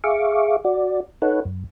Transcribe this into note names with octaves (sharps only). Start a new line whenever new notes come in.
G#4 E5 F5 C#6 D6
F#4 D5
D#4 A4 B4 C#5 F#5
F#2